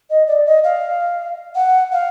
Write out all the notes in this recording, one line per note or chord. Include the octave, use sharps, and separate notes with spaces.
D#5
D5
D#5
F5
F#5
F5